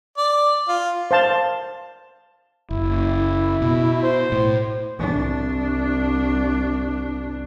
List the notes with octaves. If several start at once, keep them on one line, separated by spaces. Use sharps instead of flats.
D5
F4
C5 F5 A5
F#1 E4
B2
C5
A2
C2 D4